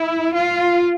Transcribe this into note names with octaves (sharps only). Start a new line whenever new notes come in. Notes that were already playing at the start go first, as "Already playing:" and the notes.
Already playing: E4
F4